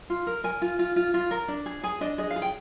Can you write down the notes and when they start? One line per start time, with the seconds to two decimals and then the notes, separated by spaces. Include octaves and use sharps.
0.10 F4
0.27 A#4
0.44 A#4 G#5
0.62 F4
0.79 F4
0.96 F4
1.14 F4
1.31 A#4
1.48 D4
1.66 G#4
1.83 G#4 G#5
2.01 D4 D#5
2.18 G#4 D#5
2.30 F5
2.36 G#4
2.42 G5